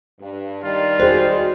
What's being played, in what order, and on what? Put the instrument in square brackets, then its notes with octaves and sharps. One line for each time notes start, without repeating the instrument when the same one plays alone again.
[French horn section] G2
[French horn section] D#3 G3 [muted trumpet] F4
[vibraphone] F#4 [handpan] G#4 C5